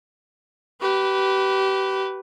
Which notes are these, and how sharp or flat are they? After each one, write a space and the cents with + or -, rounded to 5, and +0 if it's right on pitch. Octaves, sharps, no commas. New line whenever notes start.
G4 -30 B4 +0